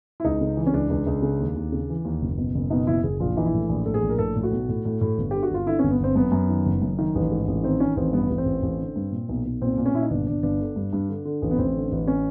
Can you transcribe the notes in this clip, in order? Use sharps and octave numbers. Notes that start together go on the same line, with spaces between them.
E4
C#2 D#4
C#3
E3
C#4
C#2 D4
C#2
C#2
C#3
D#2
D#2
C#3
E3
D#2
F#1
B2
F#1
B2 D#4
F#1 E4
F#1 G#4
A#1 F4
E3 D#4
E4
A2
A#1
A2 A4
G#4
A#1
A#4
A2 A4
A2
F#4
B1
A2
A2
A2
G1
D3 G4
F#4
G1 F4
D3 E4
C#4
G1
B3
G1 C4
F#2 B3
F#2
D#3
F#1
F#2
D#3
A1
G#2
A1
D#3 C4
D#3 C#4
A1 C4
G2 B3
A1
C4
A1
A1
D3
G2
A#2
B1
B1
A#2 C4
A#2
C#4
A#2 E4
D#4
G1 D4
G1 D4
G1 D4
D3
G2
G2
D3
D3
A1
B3
A1 C4
D3
A1
C#4